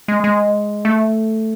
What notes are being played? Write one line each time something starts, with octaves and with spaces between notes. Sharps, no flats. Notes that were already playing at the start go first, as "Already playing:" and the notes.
G#3
G#3
A3